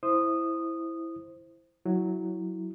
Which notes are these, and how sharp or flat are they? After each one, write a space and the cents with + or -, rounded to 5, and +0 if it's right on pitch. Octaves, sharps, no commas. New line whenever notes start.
E4 +0 C5 +0 D#6 -15
F#3 +0 E4 -10